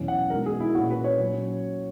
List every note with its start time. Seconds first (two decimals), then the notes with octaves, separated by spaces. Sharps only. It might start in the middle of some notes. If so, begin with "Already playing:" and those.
Already playing: E2 B2 F#3 C#4 E4
0.08 F#5
0.30 B2 G#3 D#4 A#4
0.46 G#4
0.60 E4
0.75 A#2 A#3 C#4 F#4
0.90 B4
1.04 C#5
1.19 A#2 F#3 C#4